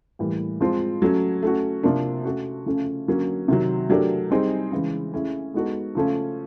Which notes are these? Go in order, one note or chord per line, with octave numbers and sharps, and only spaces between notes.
A2 E3 G3 A#3
F3 G#3 C4 F4
F#3 A3 C#4
A3 C#4 F#4
C3 F3 A#3 D4
A3 C#4 F#4
C#3 F3 A3 C#4
D3 F#3 A#3 C#4
C3 D#3 F#3
F#3 A3 D4 G4 A#4
G3 C4 D#4 G#4
C#3 E3 G#3
A3 C#4 E4 G#4
G#3 B3 D#4 F#4 A4
C#3 F3 A3 C#4